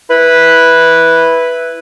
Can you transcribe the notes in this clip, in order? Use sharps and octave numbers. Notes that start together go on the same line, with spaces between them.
E4 B4